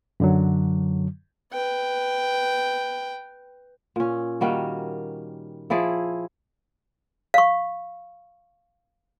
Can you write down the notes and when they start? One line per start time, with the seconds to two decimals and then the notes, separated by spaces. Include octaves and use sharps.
0.20 F#2 D3 F#3
1.52 B4 G5
3.96 A#2 C#4
4.41 D#3 G3 A#3 F#4
5.70 F3 E4 G#4 D5
7.34 F5 C#6